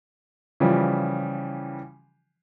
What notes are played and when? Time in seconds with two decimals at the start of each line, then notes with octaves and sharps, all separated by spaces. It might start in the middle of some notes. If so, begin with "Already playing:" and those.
0.60 C#3 E3 F3 G3